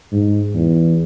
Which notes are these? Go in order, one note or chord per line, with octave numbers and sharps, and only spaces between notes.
G#2
E2